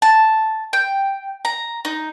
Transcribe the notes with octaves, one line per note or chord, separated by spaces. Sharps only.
A5
G5
A#5
D#4